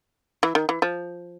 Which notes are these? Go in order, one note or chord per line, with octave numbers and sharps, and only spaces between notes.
E3
D#3
E3
F3